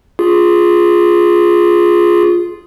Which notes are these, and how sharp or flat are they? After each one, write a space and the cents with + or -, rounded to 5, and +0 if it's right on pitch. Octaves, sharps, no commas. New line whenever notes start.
F4 +0 G#4 +0